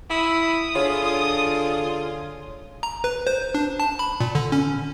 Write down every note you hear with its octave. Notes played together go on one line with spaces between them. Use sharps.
E4 D#6
D3 F4 G#4 C#5
A#5
B4
C5
D4
A5
B5
A#2
D3
C#4